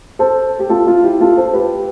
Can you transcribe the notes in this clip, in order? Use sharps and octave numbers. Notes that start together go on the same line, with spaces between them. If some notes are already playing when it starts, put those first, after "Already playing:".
A4 C5
G4
F4 A4
F4
E4 G4
F4 A4
A4 C5
G4 B4